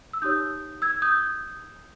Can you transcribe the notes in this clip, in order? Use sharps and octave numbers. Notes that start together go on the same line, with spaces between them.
E6
D#4 G4 C#5 D#6 G6
E6 G#6
D#6 G6